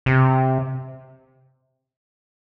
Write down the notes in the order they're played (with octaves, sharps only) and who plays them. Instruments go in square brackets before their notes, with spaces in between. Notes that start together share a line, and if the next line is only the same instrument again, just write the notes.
[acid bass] C3